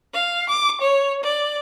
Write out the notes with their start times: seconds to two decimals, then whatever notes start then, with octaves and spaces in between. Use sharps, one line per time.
0.13 F5
0.49 D6
0.80 C#5
1.23 D5